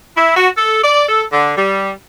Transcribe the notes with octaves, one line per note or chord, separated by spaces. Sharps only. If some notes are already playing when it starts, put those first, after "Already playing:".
E4
F#4
A4
D5
A4
D3
G3